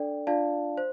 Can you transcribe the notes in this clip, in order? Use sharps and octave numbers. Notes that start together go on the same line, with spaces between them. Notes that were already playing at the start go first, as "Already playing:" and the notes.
Already playing: D4 A4 D5 G5
D4 F4 D5 F5 A5
C5